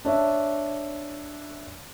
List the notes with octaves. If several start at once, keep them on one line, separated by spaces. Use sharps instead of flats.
D4 C#5 E5